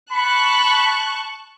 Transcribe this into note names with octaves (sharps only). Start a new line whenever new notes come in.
A5 B5 C#6 F#6